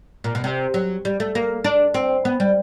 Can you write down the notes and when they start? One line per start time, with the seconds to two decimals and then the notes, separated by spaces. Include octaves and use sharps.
0.24 A#2
0.35 B2
0.44 C3
0.74 F#3
1.05 G3
1.20 A3
1.35 A#3
1.64 D4
1.94 C4
2.25 B3
2.40 G3